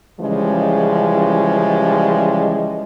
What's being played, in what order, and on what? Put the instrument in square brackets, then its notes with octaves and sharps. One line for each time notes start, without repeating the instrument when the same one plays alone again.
[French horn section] C#3 E3 F3 G3 G#3